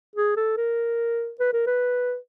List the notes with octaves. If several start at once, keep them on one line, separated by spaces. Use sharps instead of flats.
G#4
A4
A#4
B4
A#4
B4